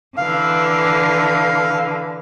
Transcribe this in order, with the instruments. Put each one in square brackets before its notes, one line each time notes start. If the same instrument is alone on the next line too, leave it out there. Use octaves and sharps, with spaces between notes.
[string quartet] D3 E3 [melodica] F5